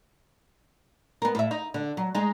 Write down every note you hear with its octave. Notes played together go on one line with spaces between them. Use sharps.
B3 A#4
A2 E5
D#4
D3
F#3
G#3 D#4